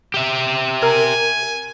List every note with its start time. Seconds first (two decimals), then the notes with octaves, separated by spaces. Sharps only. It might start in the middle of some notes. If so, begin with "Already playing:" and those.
0.14 G4 E5
0.83 A#4 G#5